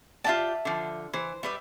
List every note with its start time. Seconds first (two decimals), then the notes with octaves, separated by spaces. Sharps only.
0.24 F4 G4 D5 E5 F#5 A5
0.65 D3 F3
1.13 E3 C5
1.43 G3 B4 D5 E5